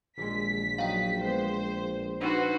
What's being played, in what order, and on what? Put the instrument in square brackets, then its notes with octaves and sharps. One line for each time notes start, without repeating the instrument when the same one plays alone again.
[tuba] A#1 [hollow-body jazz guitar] D#2 G#3 [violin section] B6
[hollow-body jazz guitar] F#2 F#3 D#4 [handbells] F5 G5
[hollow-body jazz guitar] G#3 B3 [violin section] C5
[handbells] D4 D#4 [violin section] F#4 B4 C5